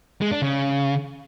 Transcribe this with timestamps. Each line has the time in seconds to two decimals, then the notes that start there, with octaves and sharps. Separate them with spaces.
0.21 G#3
0.32 D4
0.42 C#3